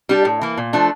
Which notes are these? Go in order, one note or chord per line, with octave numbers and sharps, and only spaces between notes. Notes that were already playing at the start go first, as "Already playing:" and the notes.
G3 D4 G4
A2
E3 A#3
A#2
F3 A3 D4